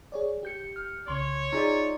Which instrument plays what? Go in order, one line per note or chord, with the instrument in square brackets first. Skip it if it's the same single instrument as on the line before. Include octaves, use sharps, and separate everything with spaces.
[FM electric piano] G#4 C#5 D5
G4 G6 C#7
[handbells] F6
[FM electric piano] C2 C#3 [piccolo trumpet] C#5 [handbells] C6
[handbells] D#4 F4 D5 [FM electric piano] G#4 A#5